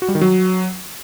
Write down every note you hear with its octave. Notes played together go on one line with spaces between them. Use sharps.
F#4
G3
D#3
F#3